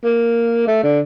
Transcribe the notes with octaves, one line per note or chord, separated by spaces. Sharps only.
A#3
A3
D3